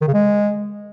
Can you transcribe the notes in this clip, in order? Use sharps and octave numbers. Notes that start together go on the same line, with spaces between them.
D#3
C#3
G#3